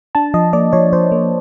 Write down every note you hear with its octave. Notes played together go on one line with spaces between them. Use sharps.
D4 A5
F3 D#5
A#3 D5
F3 C#5
F3 C5
A#3